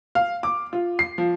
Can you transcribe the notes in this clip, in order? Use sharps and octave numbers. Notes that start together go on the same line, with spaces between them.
F5
D6
F4
C7
F3